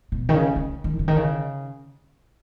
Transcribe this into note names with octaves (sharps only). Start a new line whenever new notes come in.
B2
D#3
C#3
C#3
D#3
C#3
D#3
C#3